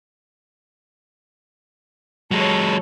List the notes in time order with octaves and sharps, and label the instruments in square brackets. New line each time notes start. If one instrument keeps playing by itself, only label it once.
[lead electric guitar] F#3 G#3 [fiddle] A4 C#5